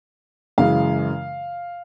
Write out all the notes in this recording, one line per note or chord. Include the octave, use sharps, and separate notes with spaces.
F#2 C#3 E3 G#3 F5